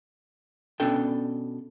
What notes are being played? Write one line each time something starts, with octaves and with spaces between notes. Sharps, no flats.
B2 C#4 D4 A4 G5